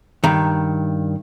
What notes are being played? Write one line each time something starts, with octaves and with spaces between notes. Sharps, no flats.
G2 D#3